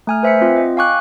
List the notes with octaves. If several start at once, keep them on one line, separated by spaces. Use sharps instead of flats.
A3 G#5 F6
B4 C5 E5 G#5 B6 C#7
C4 F4
D#5
F5 G5 G#5 C#6 D6 F#6